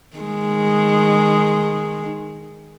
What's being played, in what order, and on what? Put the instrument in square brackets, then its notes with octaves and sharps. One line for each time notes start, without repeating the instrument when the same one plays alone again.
[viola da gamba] D#3 G#3